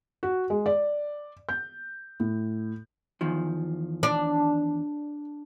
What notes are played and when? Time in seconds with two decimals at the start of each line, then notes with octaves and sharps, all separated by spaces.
0.23 F#4
0.50 G#3
0.66 D5
1.49 G6
2.20 A2
3.21 E2 D#3 F3
4.03 D4